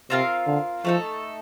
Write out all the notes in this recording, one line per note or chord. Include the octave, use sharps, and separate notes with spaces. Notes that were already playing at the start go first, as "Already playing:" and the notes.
C3 C4 F4 A#4 F5
D3
F3 A3 D#4 A4